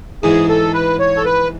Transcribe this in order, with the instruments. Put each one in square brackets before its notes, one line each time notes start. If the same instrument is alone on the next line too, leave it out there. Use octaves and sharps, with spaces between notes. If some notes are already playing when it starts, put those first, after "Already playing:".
[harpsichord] G#2 E3 G#3 [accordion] G#4
[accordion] A4
B4
C#5
A4
B4